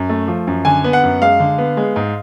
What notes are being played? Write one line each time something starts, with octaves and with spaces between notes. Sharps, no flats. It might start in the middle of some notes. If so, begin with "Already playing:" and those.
Already playing: F#2
A3
F3
F#2
D3 G#5
B3
F#5
F#2
G#3 F5
D3
B3
G#3
G#2